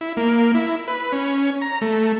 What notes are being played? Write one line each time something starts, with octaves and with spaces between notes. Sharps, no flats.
E4
A#3
E4
B4
C#4
A#5
A3